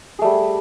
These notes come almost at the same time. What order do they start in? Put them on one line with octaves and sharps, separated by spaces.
G#4 A3 G3